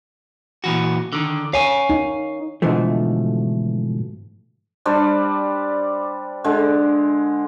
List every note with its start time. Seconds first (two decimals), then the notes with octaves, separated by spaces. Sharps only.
0.64 A#2 E3 F#4
1.13 D3 D#3
1.53 C#5 F5 G#5
1.90 D#4
2.62 G#2 B2 D3 E3 F3 A3
4.85 G3 D4 C5 D5
6.44 D3 G#3